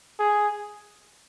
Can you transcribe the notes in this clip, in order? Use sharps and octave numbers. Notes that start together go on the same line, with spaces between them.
G#4